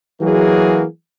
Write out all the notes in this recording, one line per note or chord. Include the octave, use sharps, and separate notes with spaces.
E3 F#3 A#3 F#4 G#4